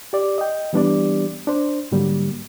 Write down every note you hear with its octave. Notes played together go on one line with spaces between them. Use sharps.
G4 D5
D#5 G5
E3 G3 B3 D4 G4 D5
D4 C5
G#2 D3 F#3 G3 A#3